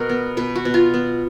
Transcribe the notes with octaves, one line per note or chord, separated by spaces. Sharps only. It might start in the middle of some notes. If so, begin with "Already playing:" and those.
Already playing: B2 A#4
B3
B2 B4
F#4
B2
F4
B3